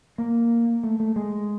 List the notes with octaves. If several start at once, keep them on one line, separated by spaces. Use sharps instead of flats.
A#3
A3
A3
G#3